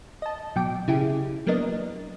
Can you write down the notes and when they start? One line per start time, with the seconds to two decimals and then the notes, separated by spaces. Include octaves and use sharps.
0.22 D#5 A5
0.56 B2 F#3 G5 D6
0.88 C#3 E4 G4 G#4
1.47 F#3 A#3 B3 D4 A#4 D#5